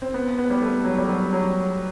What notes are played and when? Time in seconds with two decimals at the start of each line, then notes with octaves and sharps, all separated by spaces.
0.02 C4
0.14 B3
0.38 B3
0.50 G3
0.62 A3
0.85 F#3
0.98 G3
1.08 F#3
1.33 F#3